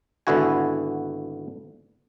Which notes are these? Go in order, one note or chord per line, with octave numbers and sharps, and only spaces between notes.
G#1 D3 B3 E4 F#4 G#5